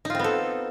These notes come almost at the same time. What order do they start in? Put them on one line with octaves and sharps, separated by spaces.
D#4 F4 C4 B3 A4